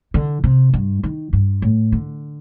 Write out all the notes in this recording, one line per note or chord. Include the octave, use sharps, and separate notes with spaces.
D3
C3
G2
D#3
G2
A2
D3